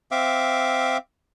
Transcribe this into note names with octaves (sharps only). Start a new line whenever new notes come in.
C4 E5 F5 D6